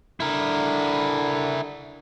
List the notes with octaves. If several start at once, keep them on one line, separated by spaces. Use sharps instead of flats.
D3 E4 A#4